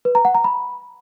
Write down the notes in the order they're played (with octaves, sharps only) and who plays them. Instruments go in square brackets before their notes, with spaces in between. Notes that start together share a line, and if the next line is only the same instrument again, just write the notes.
[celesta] B4
A#5
F#5
A#5
B5